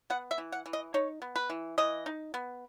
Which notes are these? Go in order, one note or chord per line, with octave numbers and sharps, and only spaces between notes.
B3 F#5
E5
E3
F#5
E3
D#5
D#4 C#5
B3
B4
E3
E3 D#5
D#4
B3